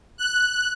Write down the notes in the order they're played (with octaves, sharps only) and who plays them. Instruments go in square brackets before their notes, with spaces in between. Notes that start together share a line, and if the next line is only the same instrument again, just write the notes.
[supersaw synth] F#6